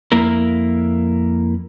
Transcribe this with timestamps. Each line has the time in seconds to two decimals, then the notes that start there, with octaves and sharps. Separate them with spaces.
0.12 F2 A#3 E4 A#4